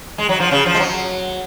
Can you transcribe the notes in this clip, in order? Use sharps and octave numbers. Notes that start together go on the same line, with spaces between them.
G#3
F#3
F3
C#3
F3
G#3
F#3